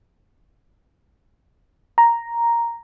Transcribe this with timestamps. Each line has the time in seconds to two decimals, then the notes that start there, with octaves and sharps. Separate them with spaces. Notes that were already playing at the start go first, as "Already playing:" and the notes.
1.98 A#5